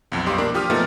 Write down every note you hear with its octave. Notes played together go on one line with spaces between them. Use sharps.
B1 F2 F3
B1 G2 G4 C6
A#3 D4 A#4
F3 G4 D#6 F6
A#2 F3 A3 B3 D#4